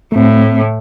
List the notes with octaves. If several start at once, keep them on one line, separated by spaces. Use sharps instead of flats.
A2 A3 C4